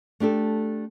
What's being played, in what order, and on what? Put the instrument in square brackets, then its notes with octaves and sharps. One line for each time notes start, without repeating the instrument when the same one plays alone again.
[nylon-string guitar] A3 D4 G4 A4